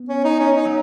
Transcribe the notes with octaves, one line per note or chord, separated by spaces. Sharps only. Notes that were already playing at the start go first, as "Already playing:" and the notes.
Already playing: B3
C#4
D#4
C#4
D#4
F#3